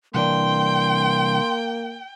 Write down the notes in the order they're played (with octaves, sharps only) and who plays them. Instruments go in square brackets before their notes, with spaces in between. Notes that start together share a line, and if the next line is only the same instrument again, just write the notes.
[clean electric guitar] C2 E3 D4 [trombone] A#3 [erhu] G5 [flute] C6